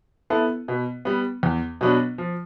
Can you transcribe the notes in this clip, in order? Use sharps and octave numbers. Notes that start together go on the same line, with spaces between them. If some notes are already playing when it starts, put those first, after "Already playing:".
B3 E4 A4
B2
G3 B3
E2
B2 F#3 B3 D4
F3